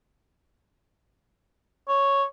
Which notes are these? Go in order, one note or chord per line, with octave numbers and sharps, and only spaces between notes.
C#5